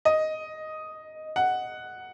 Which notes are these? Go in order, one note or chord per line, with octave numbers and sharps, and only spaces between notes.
D#5
F#5